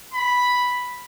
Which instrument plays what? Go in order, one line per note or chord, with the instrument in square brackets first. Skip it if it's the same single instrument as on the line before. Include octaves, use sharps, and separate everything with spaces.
[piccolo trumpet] B5